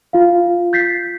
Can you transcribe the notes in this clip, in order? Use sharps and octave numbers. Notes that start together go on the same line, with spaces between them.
F4 F5
G6 A6 B6 C7